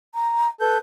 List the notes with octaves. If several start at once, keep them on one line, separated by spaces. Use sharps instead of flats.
A#5
A4 B4 G6